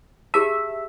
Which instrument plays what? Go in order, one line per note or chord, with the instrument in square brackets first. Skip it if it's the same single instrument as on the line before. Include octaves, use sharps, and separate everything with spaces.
[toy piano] G4 G#4 A5 [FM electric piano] E5